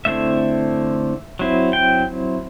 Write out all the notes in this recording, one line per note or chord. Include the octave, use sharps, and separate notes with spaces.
D3 A3 C4 E4 E5
F#3 C4 E4
G5